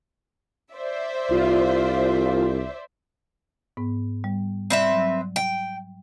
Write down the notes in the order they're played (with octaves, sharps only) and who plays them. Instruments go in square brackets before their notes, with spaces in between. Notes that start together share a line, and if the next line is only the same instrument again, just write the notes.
[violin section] C5 D5 E5
[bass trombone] C2 [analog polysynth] F4
[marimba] G#2 B3
G3
[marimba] G3 D5 G6 [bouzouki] C4 B4 E5
[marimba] F#3
[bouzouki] G5